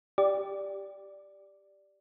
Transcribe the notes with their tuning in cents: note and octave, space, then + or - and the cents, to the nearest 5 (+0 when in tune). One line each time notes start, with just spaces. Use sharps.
G4 +0 D5 +0